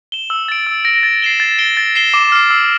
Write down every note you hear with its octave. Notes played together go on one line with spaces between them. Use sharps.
E7 G7
E6
A6 D7
E6
A#6 D7
A6
C7 E7 G7
A6
D7 G7
A6
C7 E7 G7
D6
F6 C7
E6